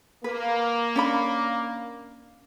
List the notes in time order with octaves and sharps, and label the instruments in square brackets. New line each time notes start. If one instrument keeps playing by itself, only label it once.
[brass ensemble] A#3 [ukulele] B4
[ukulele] C#4 D4 B5